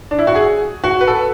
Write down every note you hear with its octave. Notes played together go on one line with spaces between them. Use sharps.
D4
E4
F#4
G#4
F#4
B4
A4